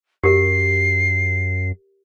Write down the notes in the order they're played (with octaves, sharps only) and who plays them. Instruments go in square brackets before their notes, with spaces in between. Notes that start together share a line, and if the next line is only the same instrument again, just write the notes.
[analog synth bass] F#2 [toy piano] G4 A#4 [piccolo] C7